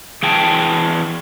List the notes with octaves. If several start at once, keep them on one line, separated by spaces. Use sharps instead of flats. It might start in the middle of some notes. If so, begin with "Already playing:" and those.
E3 G#4 G5 A5